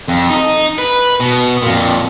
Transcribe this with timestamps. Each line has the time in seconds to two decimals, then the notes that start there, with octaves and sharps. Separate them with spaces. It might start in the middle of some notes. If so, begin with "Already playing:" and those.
0.08 F2
0.29 D#4
0.78 B4
1.20 B2
1.62 F2 A#2